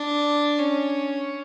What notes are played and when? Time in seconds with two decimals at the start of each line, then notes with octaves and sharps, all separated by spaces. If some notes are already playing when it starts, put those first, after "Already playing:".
Already playing: D4
0.58 C#4